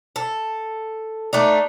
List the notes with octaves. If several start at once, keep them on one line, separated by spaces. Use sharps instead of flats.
A4
A3 D4 D#4